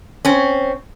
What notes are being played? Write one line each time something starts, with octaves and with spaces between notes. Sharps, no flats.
C4 C#4